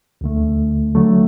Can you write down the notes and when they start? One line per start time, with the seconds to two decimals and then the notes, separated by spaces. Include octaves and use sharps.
0.21 D2 D3 A3
0.95 D3 F#3 A3